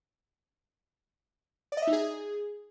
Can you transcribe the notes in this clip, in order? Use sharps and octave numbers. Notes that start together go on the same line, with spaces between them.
D5
D#5
E5
D#4
G#4